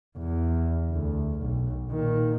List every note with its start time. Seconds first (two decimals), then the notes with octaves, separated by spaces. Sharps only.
0.19 E2
0.91 D2
1.40 B1
1.91 A#2 D#3